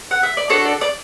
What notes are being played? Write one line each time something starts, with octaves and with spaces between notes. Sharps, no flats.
F#5
E5
D5
D4 F#4 A4 C#5
D5
D5